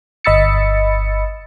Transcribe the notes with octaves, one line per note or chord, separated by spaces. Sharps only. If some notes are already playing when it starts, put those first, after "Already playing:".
G1 D#5 B5 E6 A6 C#7